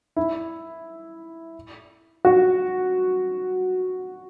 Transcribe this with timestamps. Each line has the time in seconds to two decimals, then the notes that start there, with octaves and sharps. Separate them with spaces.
0.16 E4
2.25 F#4